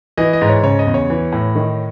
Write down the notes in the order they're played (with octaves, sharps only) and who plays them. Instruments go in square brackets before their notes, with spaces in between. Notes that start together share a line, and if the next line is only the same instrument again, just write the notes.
[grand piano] E3 D#5
D#5
G#2
C#5
C#3 C#5
D#5
E2
C#5
E3
A2
D#3